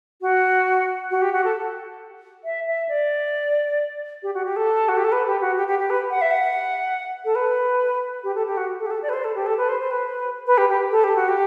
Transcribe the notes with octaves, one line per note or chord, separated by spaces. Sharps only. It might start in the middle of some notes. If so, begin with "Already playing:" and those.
F#4
F#4
G4
F#4
A4
E5
E5
D5
G4
F#4
G4
A4
F#4
G4
A4
B4
G4
F#4
G4
G4
G4
B4
F#5
E5
F#5
A4
B4
G4
A4
G4
F#4
A4
G4
A4
D5
B4
C5
A4
G4
A4
B4
C5
C5
B4
B4
G4
G4
A4
G4
F#4
G4